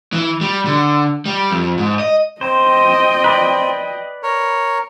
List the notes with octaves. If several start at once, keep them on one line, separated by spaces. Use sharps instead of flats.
E3
G3
D3
G3
F2
G#2
D#5
C4 C5 D#5 G5
B4 D5
A#4 C#5